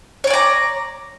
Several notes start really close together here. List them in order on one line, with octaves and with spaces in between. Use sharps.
C#5 D5 G#5 A#5